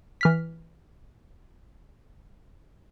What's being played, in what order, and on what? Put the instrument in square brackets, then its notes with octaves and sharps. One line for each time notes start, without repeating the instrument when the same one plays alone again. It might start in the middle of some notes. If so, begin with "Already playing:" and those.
[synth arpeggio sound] E3 F6 B6